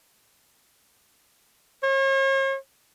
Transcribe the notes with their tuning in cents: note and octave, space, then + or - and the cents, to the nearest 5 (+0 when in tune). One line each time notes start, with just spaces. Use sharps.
C#5 -45